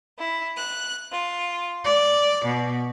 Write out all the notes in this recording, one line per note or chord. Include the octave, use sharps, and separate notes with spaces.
E4
F#6
F4
D5
B2